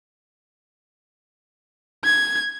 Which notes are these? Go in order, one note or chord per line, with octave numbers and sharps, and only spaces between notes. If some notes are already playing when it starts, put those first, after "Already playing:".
G#6